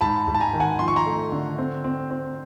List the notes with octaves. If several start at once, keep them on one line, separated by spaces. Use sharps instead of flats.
G#2 A5 B5
G#2
A5
G#5 A#5
D#3
F#5 G#5
F3 C6
C#6
A#5 C6
A3
D3
C4
C4
C4